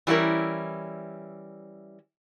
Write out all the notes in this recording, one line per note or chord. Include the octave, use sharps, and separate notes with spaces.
E3 G3 C#4 E4 A#4